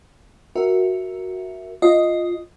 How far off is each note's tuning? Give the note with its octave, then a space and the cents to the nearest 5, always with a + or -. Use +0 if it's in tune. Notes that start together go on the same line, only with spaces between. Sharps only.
F#4 +0 A#4 +0 E5 +0
F4 +0 D#5 +0